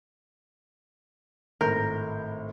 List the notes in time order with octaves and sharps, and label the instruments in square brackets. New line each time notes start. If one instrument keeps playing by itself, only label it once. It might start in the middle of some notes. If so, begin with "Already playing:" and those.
[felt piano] G#1 A2 G6 [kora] A#4